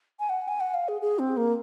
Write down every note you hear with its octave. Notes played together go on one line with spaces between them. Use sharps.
G#5
F#5
G#5
F#5
F5
G#4
G#4
C4
A#3